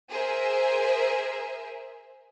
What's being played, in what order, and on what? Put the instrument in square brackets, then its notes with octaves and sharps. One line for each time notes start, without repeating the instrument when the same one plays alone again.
[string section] G#4 A#4 C5 E5